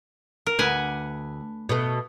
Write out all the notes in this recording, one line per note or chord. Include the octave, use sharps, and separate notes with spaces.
A#4
D2 B4 F#5 G#5
B2 A3